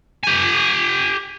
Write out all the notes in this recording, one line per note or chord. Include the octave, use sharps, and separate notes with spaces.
G4 G#5